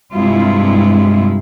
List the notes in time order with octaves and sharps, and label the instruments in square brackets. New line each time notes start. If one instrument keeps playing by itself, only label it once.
[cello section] G2 C3 G3 G#3 E4 F4